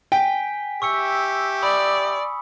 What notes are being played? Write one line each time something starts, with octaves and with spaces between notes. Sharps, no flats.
G5 G#5 B6
G4 E5 C#6 E6 C#7
D5 B5 D#6